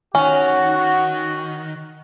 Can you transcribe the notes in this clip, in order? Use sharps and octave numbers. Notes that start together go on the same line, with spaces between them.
D#3 C#4 F#4